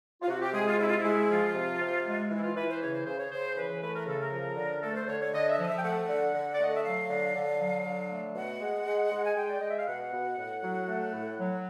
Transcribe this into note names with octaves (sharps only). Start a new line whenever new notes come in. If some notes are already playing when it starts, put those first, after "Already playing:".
F4
C3 F#4
G4
G#3 G#4
F4
C3 E4
F4
E4
G#3
F3 F4
C3
C3
G#3
E3
E4
F4
E3 B4
C5
C#3 C#5
C5
C#3 C5
C#5
C#3 C5
E3 B4
A3 B4
A#4
C#3 A4
A#4
F3
D3
A3 A4
B4
C5
D3 C#5
C#5
D3 D#5
E5
F3 D#5
E5
G5
A3 F#5
D3
D3
D5
A3 D#5
E5
F#3 F5
D3
D3
F#3
D3
A3
B2 F#5
G#3
G#3
G#3
G#5
G#3 G5
D5
G#3 D#5
E5
F5
B2 F#5
B2
A2
F#3
A3
A2
F#3